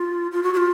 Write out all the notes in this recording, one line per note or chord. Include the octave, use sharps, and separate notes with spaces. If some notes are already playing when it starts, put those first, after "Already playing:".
Already playing: F4
F4
F#4
F#4
F4